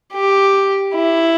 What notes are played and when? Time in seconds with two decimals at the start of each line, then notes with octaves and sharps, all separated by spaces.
0.14 G4
0.95 E4